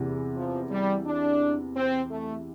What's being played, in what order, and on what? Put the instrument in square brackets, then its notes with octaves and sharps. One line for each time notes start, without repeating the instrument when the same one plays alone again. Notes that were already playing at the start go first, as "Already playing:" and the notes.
Already playing: [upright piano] E2 C3 E3
[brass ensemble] F3
G3
D4
C4
A3